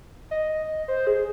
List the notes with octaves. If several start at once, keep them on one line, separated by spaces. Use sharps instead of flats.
D#5
C5
G#4